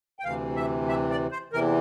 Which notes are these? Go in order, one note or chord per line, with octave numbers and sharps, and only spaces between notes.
G5
D2 C3 E3 F5
E5
E5
D5
C5
E2 C3 E3 A#4